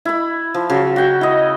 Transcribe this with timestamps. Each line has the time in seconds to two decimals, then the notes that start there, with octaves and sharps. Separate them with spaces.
0.05 E4 B5
0.54 F3
0.70 C#3 F#3
0.96 F#4 G5
1.21 E4 D#5